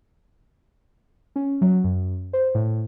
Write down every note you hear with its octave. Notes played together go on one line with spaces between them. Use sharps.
C#4
F#3
F#2
C5
A2